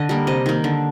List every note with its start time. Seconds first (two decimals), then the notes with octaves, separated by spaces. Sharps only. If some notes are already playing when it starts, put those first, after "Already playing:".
Already playing: D3 D#5
0.09 G3 A#3
0.27 C3 D#5
0.46 D#3 A#3
0.64 D3